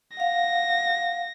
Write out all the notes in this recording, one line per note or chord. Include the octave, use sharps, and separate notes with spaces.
F5 F#5 A#6